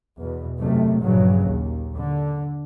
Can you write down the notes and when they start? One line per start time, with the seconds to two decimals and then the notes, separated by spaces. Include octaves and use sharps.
0.19 E2 B2
0.59 F#2 C3 D#3 A3
1.02 A#1 G2 C#3 F#3
1.45 D#2
1.95 D3